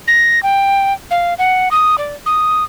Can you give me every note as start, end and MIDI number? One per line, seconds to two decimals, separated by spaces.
0.07 0.42 94
0.43 0.93 79
1.11 1.34 77
1.38 1.69 78
1.71 1.96 87
1.98 2.15 74
2.26 2.64 87